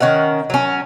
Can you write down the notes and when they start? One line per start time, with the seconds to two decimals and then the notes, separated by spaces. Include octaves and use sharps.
0.01 D#3 C#4 D#4 F#5
0.50 F#3 C#4